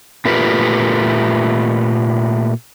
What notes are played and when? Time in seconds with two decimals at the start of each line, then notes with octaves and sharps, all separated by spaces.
0.25 A#2 A3 F4 G4 A#4 B4